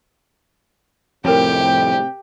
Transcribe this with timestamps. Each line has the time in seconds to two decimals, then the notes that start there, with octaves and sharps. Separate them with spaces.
1.25 F2 A2 C3 G4 A#4 C#5 G5